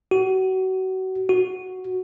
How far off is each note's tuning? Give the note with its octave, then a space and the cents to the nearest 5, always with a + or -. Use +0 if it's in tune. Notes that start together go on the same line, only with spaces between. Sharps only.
F#4 +30
F#4 +0